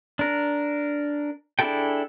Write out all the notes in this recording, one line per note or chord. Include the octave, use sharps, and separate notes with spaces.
D4 A#4
D4 E4 G#4 A4 G5